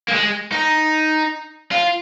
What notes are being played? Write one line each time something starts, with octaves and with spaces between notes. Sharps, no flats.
A#3
G#3
D#4
F4